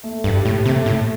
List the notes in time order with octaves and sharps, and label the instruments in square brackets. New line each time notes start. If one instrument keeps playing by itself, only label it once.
[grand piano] A3
[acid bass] G2
[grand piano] G4
[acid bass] A2
[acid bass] C3 [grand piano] A3
[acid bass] A2
[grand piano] A3